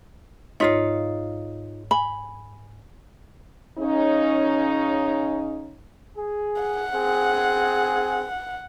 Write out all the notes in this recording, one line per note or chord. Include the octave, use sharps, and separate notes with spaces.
G#2 D#4 F4 C#5 F5
G#5 B5
C#3 C#4 D#4
G#4
F#5
C4 G#4